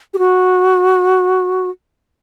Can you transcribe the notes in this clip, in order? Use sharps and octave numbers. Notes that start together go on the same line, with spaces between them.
G4
F#4